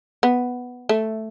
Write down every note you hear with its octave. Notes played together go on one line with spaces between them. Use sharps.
B3
A3